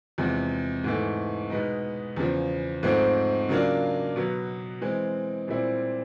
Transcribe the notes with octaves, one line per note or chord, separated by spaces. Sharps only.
E2 C3 F3 G#3
G#2 E3 A3
B2 G#3 B3 D#4
E2 C#3 F3
G#2 F3 A3 C4
C#3 F#3 A#3 D4 F4
B2 F#3 B3
E3 G#3 C4
A#2 G3 C4 E4